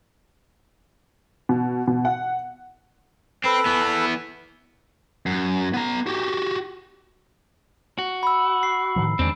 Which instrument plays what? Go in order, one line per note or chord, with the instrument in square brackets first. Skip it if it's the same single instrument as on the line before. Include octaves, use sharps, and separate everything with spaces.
[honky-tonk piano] B2
B2
F#5
[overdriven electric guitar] C4 [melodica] A4 B4 B5
[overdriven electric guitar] E3 B3
[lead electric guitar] F#2
B3 A#5
F#4 G4
F#4
[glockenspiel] B5 E6
C7
[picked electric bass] A2 D#3 F3
[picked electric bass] E2 D#3 G#3 [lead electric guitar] C4 D4